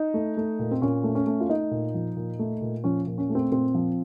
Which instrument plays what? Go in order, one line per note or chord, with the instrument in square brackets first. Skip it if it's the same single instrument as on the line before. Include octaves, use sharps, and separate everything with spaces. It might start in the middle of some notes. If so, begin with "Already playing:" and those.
Already playing: [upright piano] D#4
A3
A3
A#2
C4
A#2 C#4
A3
C#4
A3
F4
A3 D#4
A#2
F3
A#2
A3
A#2
F3 C#4
A#2
C#4
A3
C4
A#2 C4
F3